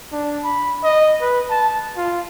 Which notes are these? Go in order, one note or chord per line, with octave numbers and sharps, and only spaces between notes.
D4
B5
D#5
B4
A5
F4